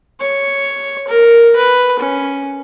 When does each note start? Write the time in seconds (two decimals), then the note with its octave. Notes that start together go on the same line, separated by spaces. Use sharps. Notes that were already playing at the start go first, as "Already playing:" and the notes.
0.20 C#5
1.08 A#4
1.56 B4
1.99 C#4